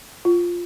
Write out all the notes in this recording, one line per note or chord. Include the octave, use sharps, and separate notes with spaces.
F4